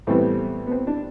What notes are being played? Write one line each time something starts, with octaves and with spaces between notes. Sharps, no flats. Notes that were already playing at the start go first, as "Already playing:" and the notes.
A2 E3 G3 B3 C4
B3
C4
D4